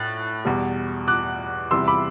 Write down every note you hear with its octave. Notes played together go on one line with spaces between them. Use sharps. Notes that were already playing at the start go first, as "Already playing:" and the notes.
Already playing: A2 F#6 A6
E2 B2 G3
D6 F#6
E2 C3 E3 G3 C6 E6
B5 D6